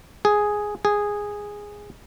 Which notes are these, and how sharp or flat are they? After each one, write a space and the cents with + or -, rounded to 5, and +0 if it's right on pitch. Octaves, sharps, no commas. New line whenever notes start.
G#4 +0
G#4 -10